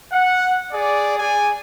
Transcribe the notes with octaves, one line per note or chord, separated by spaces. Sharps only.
F#5
G#4 D5
G#4 D5 G#5